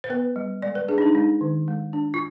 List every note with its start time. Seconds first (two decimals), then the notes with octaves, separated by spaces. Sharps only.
0.04 C5
0.10 B3 B4
0.36 G3
0.62 G#3 D5
0.75 B4
0.88 D4 G#4
0.98 D#4
1.02 D4
1.15 G#3 D#4
1.41 D#3
1.68 G#3
1.93 D4
2.14 F4